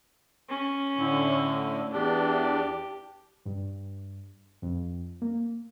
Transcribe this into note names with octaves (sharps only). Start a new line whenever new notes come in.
C#4
A2 D3
E2 D4 G4
G2
F2
A#3